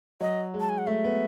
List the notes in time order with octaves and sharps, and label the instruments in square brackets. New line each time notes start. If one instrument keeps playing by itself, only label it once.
[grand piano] F#3 [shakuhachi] D#5
[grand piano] G#3
[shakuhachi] A5
G#5
F#5
[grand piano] A3 [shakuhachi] E5
[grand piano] B3